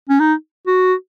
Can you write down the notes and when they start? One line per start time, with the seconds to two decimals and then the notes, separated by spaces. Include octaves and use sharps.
0.09 C#4
0.20 D#4
0.66 F#4